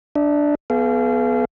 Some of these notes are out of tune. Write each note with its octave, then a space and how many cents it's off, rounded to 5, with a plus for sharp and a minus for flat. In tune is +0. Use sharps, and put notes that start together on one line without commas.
D4 +0 E5 -30
B3 +0 G#4 +40 F5 -30